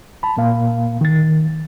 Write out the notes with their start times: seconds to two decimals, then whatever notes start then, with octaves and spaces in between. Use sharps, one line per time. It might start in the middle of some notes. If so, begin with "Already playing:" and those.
0.23 A5 B5
0.37 A#2 A#3 F5
1.01 D#3 A6